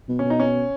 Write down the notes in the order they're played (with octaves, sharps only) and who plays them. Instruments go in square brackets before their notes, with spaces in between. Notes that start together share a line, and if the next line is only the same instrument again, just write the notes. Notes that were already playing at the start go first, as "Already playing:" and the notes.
[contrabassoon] B2
[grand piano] C#4
[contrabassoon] B2
[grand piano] D#4
C#4